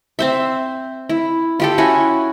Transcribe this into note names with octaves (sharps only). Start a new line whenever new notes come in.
C4 C5 E5
E4
F4 G4 A4
C#4 E4 F#4 G#5